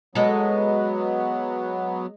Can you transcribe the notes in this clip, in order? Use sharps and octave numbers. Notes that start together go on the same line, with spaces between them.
F#3 G#3 B3 A4